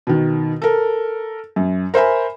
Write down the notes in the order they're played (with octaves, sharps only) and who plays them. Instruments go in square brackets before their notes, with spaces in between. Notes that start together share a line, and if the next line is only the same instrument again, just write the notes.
[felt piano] B2 D#3
A4 A#4
F#2
A#4 C5 E5 G#5 B5